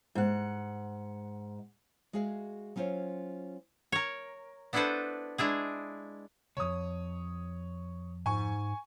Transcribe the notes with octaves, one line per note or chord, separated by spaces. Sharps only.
G#2 F#5
G#3 F#4 G#4 E5 F5
F#3 C#4 F4 C5 C#5
A#4 C#5
B3 D4 E4 A4 B4 C5
G#3 D4 E4 G#4
C2 F2 C#5 D#6
G#2 G#5 C#6